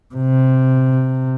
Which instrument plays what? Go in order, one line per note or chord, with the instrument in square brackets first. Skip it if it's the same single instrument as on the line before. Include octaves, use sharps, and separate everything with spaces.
[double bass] C3